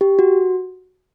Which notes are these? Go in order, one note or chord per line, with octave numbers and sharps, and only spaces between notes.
G4
F#4